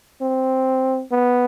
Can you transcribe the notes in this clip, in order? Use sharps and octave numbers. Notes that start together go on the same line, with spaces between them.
C4
B3